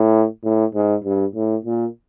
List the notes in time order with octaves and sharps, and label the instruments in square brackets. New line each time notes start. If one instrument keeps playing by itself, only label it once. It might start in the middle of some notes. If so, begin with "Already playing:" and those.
Already playing: [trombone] A2
A2
G#2
G2
A2
A#2